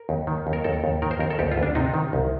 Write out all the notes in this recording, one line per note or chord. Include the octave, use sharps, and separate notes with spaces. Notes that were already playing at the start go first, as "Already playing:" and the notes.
Already playing: A#4
D#2
D#3
D#2
A#4
D#2 A4
D#2
D#3 A#4
C5
D#2 A#4
A4
D2 G4
F4
D2
D4
C3 D#4
D#3
C2